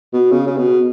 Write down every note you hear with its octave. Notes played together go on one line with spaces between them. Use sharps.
B2
C#3
C#3
B2